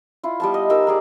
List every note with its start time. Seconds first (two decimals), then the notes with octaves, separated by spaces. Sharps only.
0.23 E4 F4
0.40 G3 B3 A5
0.54 D#5
0.70 G3 D#4 A#4 E6
0.87 D#4 G#4 D5